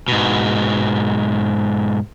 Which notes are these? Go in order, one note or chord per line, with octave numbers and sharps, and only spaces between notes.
G#2 B2